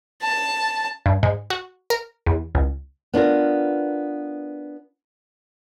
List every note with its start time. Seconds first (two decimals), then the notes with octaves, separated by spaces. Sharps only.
0.23 A5
1.06 G2
1.23 G#2
1.50 F#4
1.90 A#4
2.26 E2
2.55 C#2
3.14 B3 D4 F4 A#4